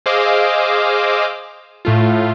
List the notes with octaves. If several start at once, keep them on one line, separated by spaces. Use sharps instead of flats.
G#4 C5 D#5 F5 D6 E6
A2 A3 F4